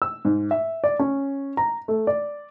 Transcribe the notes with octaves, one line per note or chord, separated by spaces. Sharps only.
E6
G#2
E5
D5
C#4
A#5
A3
D5